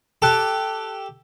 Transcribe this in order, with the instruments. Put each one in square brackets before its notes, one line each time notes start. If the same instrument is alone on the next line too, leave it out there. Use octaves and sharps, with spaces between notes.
[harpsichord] G4 A4 [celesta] A5 F#6